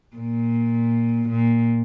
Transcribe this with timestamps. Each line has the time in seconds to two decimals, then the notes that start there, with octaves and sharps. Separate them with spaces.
0.14 A#2
1.28 A#2